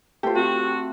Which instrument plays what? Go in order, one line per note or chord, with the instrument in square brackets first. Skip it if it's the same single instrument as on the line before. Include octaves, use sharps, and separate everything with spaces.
[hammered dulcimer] A3 F4 [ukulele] G4 C5
[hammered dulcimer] C4 C#6 [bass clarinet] F#4